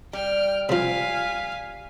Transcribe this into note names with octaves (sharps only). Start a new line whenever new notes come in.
G3 G5 F6
C3 F3 F5 G#5 B6